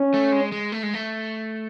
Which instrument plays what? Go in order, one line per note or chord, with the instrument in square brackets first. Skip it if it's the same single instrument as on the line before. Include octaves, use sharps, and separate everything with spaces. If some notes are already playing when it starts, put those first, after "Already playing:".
Already playing: [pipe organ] C#4
[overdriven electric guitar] A3
G#3
G#3
A3
G#3
A3